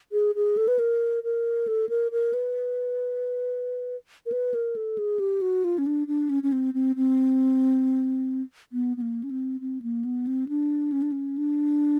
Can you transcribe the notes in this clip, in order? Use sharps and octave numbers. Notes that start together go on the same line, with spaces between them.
G#4
G#4
A4
B4
A#4
A#4
A4
A#4
A#4
B4
A#4
B4
A#4
A4
G#4
G4
F#4
F4
C#4
D4
D4
C#4
C#4
C4
C4
C4
B3
B3
A#3
C#4
C4
C4
A#3
B3
C4
D4
C#4
D4
C#4
D4